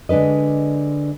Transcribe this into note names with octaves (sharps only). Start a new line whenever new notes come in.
D3 G#3 D4 B4 D#5